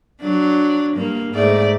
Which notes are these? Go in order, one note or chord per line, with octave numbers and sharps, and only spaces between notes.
F#3 D4
G2 A#3
G#2 A3 D5